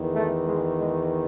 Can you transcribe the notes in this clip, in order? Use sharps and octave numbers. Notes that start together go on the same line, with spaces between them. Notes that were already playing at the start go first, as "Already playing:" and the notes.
Already playing: E2 D#3
A3
G#3
G#3